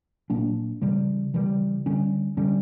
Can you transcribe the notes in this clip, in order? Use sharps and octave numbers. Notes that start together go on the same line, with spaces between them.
A#2 F#3 A#3 D4
C#3 E3 G3
C#3 E3 G3
D3 G3 C#4
D3 G3 C#4